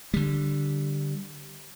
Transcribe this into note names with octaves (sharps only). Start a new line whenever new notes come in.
D3 G3